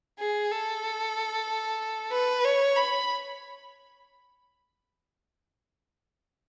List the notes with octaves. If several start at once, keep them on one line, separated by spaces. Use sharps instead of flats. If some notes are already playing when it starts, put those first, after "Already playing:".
G#4
A4
B4
C#5
B5